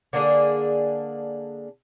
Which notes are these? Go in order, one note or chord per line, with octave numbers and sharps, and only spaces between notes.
D3 A#3 D4 G#4